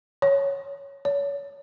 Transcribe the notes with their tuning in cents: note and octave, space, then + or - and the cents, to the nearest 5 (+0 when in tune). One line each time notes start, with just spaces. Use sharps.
C#5 +0
C#5 +30